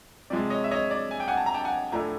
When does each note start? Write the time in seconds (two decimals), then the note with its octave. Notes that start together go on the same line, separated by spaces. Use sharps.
0.30 C3 F3 G#3 D5
0.50 C#5 D#5
0.64 E5
0.71 C#5 D#5
0.91 D5
1.11 G#5
1.20 G5
1.28 F#5 G#5
1.37 A5
1.46 A#5
1.54 G5 A5
1.65 F#5 G#5
1.92 A2 F3 A3 D4 G#5 A#5